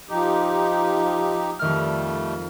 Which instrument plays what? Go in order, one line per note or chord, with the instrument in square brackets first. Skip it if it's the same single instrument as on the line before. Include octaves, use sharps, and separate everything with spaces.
[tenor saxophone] F3 [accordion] D#4 G4
[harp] F2 D#3 F6 [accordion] G3 A3